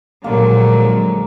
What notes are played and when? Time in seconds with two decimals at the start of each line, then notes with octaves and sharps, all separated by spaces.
0.24 A#1 D3 F#3 G#3 A#3